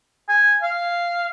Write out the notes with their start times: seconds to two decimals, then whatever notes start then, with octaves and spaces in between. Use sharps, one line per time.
0.29 G#5
0.63 F5